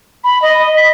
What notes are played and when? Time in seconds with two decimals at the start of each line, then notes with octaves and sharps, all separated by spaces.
0.24 B5
0.42 D#5
0.77 B6